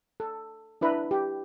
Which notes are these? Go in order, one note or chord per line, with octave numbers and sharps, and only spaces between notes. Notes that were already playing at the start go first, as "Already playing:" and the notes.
A4
D4 E4 B4 E5 A#5 B5
G4